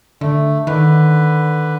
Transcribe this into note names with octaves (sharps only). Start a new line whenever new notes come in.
D3 A3
D3 D#3 B4